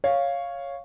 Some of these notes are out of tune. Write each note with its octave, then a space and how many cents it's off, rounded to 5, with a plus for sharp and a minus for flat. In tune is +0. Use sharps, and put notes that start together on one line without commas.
C#5 +0 F5 +0